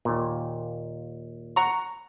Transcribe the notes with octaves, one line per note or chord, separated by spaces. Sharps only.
D#2 A#2
F#5 A#5 C#6